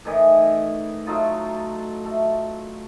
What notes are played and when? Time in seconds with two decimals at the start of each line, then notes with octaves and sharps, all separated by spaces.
0.05 A2 D#3 E3 D#5
1.07 F#3 A3 D#4 F4
2.05 A3